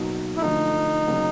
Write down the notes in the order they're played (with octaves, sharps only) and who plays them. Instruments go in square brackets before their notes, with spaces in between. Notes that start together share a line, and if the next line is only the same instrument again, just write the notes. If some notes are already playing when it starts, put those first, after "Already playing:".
Already playing: [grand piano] B2 F#3 A#3 D#4
[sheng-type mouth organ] E4
[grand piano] D3 F3 A3 [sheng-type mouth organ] D#4
[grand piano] C#3 F#3 A#3